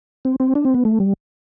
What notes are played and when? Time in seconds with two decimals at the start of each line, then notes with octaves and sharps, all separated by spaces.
0.25 C4
0.40 C4
0.55 D4
0.65 C4
0.74 B3
0.85 A3
1.00 G3